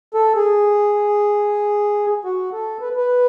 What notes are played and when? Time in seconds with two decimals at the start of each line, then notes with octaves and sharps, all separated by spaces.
0.14 A4
0.36 G#4
2.25 F#4
2.52 A4
2.81 B4
2.97 B4